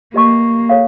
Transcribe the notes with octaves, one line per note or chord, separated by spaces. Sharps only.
A#3 G4 B4 D#5 G#5 C#6
A4 C#5 F5